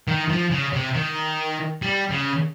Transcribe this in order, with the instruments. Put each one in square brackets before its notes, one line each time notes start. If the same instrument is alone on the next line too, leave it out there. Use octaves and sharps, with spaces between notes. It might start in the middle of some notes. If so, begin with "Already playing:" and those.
[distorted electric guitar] D#3
F3
C#3
C3
D#3
G3
C#3